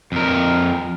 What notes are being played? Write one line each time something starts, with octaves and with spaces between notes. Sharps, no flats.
F2 A#4